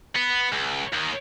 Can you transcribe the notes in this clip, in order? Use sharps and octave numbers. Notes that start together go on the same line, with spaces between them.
B3
C#2
D#2 D#3